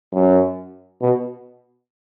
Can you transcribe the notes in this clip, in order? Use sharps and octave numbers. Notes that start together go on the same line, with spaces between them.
F#2
B2